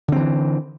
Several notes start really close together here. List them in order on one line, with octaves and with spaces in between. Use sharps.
D3 C4 E3